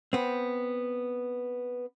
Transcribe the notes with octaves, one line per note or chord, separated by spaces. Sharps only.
B3 C4